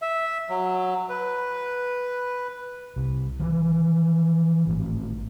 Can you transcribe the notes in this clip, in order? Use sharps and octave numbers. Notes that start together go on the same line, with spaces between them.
E5
F#3
B4
C2
E3 F3
G#1 A2